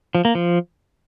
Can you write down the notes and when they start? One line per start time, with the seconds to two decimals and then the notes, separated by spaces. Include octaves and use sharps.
0.15 F3
0.25 A#3
0.35 F3